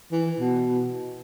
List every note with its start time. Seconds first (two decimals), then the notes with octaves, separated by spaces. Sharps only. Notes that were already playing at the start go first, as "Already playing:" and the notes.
0.12 E3
0.39 B2